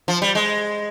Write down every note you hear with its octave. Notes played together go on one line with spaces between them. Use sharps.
F3
G3
G#3